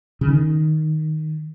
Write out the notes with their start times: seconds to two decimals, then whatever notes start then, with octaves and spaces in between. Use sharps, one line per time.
0.21 C#3
0.28 D#3